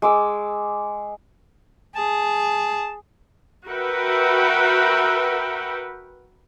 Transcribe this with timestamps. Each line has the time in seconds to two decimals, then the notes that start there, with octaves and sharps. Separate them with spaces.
0.02 G#3 D6 E6
1.96 G#4 A5
3.68 F#4 A#4 B4 E5 F#5 G5